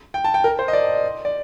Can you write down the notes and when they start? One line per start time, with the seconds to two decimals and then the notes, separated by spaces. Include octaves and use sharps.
0.14 G5
0.24 A5
0.34 G5
0.44 A#4
0.59 C5
0.68 D#5
0.73 D5
1.25 D5